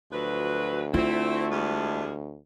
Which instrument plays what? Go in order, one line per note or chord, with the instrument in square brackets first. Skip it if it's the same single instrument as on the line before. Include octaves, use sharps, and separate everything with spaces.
[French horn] D2 [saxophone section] F3 F#3 B4
[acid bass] A3 [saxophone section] C4 E4 [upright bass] F4
[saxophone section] E2 G3 G#3